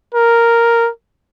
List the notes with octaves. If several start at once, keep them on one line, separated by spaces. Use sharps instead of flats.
A#4